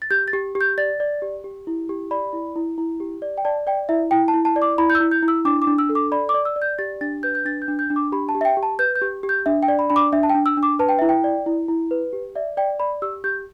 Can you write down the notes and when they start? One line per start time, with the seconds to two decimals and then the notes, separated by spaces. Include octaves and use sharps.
0.02 A6
0.11 G4 G6
0.28 A6
0.33 G4
0.55 G4
0.61 G6
0.78 D5 A6
1.00 D5
1.22 G4
1.44 G4
1.67 E4
1.89 G4
2.11 D5 B5
2.33 E4
2.56 E4
2.78 E4
3.00 G4
3.22 D5
3.38 G5
3.45 D5 A5
3.67 D5 G5
3.89 E4 E5
4.11 E4 G5
4.28 A5
4.34 E4
4.45 A5
4.56 D5
4.62 D6
4.78 E4 B5
4.90 G6
4.95 E6
5.00 E4
5.11 G6
5.22 E4
5.28 E6
5.45 D4 D6
5.62 D6
5.67 D4
5.78 E6
5.89 A4
5.95 D6
6.12 D5 B5
6.29 D6
6.34 D5
6.45 E6
6.56 D5
6.62 G6
6.79 G4 A6
7.01 D4 A6
7.23 B4 G6
7.35 G6
7.45 D4 A6
7.62 G6
7.68 D4
7.79 G6
7.90 D4
7.96 D6
8.12 G4 B5
8.29 A5
8.35 G4
8.41 E5
8.45 G5
8.57 G4
8.63 A5
8.79 B4 G6
8.96 G6
9.01 G4
9.23 G4
9.29 G6
9.46 D4 E5
9.63 G5
9.68 D5
9.79 B5
9.90 D4 B5
9.96 D6
10.12 D4 E5
10.23 A5
10.30 G5
10.35 D4
10.46 E6
10.57 D4
10.63 D6
10.79 B4 A5
10.89 G5
10.99 E4 E5
11.09 G5
11.24 D5
11.46 E4
11.68 E4
11.91 B4
12.13 G4
12.35 D5 E5
12.57 D5 G5
12.80 D5 B5
13.02 G4 E6
13.24 G4 G6